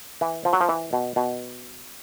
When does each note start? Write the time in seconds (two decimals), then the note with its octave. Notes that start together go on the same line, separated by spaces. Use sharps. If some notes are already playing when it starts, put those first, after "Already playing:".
0.21 E3
0.45 F3
0.53 F#3
0.61 F3
0.69 E3
0.93 B2
1.16 B2